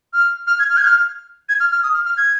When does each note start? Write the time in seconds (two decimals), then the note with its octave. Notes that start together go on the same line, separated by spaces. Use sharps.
0.13 F6
0.47 F6
0.59 G#6
0.70 F6
0.77 G#6
0.85 F6
1.49 G#6
1.60 F6
1.72 F6
1.83 D#6
1.94 F6
2.06 F6
2.17 G#6